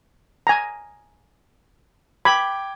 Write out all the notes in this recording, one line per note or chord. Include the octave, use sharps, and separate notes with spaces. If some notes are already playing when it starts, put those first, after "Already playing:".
G#5 A#5
G5 B5 D6 G#6